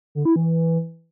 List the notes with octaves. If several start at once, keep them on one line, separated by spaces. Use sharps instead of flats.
D3
E4
E3